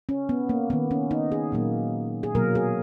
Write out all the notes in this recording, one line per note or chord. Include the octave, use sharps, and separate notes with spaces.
C#4
B3
A#3
D#3 A#3 B3
C#4
D#4
G#4
A#2 F#3 A#3
G#4
B2 F#3 A#3 A#4
G#4